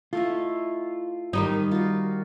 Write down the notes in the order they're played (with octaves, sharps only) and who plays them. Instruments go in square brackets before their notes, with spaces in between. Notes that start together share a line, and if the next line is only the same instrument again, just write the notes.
[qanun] A3 E4 D#5 [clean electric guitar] F4
[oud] D#3 G3 D#4
[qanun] F4 F#4